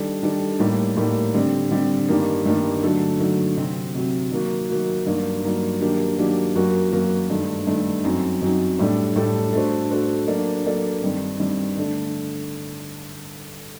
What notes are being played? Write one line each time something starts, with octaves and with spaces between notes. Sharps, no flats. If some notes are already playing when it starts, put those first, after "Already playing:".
Already playing: D#3 G3 D4 A4
D#3 G3 D4 A4
A2 G3 A#3 D#4
A2 G3 A#3 D#4
D3 G3 C4
D3 G3 C4
G2 D#3 G3 A#3 D#4
G2 D#3 G3 A#3 D#4
D3 F#3 A3 D#4 A4
D3 F#3 A3 D#4 A4
C3 F#3 C4
C3 F#3 C4
D#3 F#3 A#3 F#4
D#3 F#3 A#3 F#4
G2 F#3 A#3 D#4
G2 F#3 A#3 D#4
D#3 F#3 A#3 D4 G4
D#3 F#3 A#3 D4 G4
F#2 F#3 A#3 F#4 A#4
F#2 F#3 A#3 F#4 A#4
G2 D#3 A3
G2 D#3 A3
F#2 F#3 C4 D#4
F#2 F#3 C4 D#4
A2 G3 D4 A4
A2 G3 D4 A4
A3 D4 F#4 A4 C5
A3 D4 F#4 A4 C5
F#3 A#3 D4 A4 D5
F#3 A#3 D4 A4 D5
G2 D#3 G3 C4
G2 D#3 G3 C4
D3 A3 D4